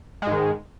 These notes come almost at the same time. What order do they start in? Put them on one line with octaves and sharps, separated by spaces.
G#3 G#2 D#3